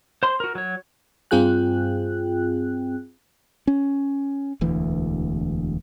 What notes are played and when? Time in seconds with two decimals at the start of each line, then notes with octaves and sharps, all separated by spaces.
0.23 C5 C6
0.40 F#4 A#4
0.55 F#3 C#5
1.31 G2 C4 F4 G#4 G5 F#6
3.67 C#4
4.61 E1 D2 E3